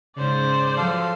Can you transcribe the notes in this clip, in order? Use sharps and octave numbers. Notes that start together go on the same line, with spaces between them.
G#2 C#3 C5 D5
F3 F#3 A4 F5 E6